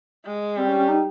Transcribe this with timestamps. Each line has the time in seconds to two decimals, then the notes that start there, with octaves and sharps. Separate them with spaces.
0.26 G#3
0.57 G3 C4
0.68 C#4
0.79 C#4
0.89 D#4